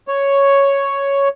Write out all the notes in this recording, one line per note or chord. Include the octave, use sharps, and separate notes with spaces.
C#5